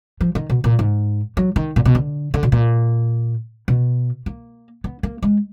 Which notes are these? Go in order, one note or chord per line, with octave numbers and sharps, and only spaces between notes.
F3
D#3
B2
A#2
G#2
F#3
D#3
A#2
B2
D3
D3
B2
A#2
B2
A#3
B3
A#3
G#3